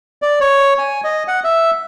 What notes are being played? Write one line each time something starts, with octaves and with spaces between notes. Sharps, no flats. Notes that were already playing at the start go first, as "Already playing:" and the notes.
D5
C#5
G#5
D#5
F#5
E5